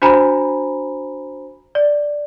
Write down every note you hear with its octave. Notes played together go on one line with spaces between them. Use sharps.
D4 F#4 C5 G#5 A#5 B5
D5